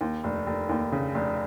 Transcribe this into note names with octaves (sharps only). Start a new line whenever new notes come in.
D#2
F1
F1
D#2
C#3
F1